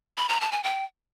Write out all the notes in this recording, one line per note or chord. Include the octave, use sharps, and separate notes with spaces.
B5
A#5
A5
G#5
G5